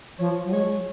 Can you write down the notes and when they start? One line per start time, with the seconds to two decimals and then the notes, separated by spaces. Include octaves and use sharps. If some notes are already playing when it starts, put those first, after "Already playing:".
0.19 F3 C#5
0.45 F#3
0.52 G#3 C#5